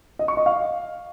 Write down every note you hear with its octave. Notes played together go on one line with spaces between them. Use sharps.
D#5
C#6
D#5
F5